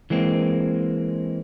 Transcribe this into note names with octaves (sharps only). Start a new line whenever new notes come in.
E3 G#3 A#3 C4